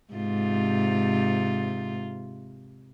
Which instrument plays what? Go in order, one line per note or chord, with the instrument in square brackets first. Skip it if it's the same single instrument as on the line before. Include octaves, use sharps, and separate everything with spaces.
[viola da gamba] G#2 C3 F4